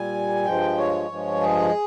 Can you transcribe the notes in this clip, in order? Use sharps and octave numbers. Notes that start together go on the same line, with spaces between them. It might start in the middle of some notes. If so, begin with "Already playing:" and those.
Already playing: A#2 G3 G#5
G2 F3 G#3 G5
C#5
G2 F3 G#3
G#4